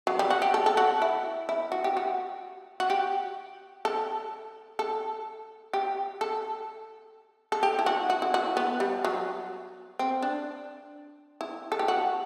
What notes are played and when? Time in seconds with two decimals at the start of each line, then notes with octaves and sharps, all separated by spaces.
0.07 F#3
0.19 G3
0.30 F#4
0.42 G4
0.54 A4
0.66 A4
0.77 F#4
1.02 E4
1.49 E4
1.72 F#4
1.84 G4
1.97 F#4
2.80 F#4
2.90 G4
3.85 A4
4.79 A4
5.73 G4
6.21 A4
7.52 A4
7.63 G4
7.79 E4
7.86 F#4
8.10 F#4
8.22 E4
8.34 F#4
8.57 B3
8.80 G3
9.05 F#3
9.99 C4
10.22 D4
11.41 E4
11.72 A4
11.79 G4
11.88 F#4